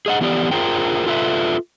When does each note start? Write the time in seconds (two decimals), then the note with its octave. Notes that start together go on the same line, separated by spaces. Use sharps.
0.06 G#4 D#5 F#5
0.21 E3 B3 G4 D5
0.51 F4 G#4 A#4 C5 G5
1.07 F4 A4 B4 E5